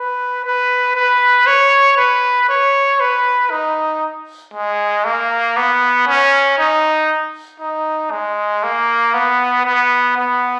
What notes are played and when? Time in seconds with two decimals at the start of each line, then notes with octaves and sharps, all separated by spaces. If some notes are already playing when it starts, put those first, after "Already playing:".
Already playing: B4
0.45 B4
0.95 B4
1.47 C#5
1.97 B4
2.49 C#5
3.00 B4
3.51 D#4
4.54 G#3
5.05 A#3
5.56 B3
6.08 C#4
6.58 D#4
7.60 D#4
8.11 G#3
8.63 A#3
9.13 B3
9.65 B3
10.17 B3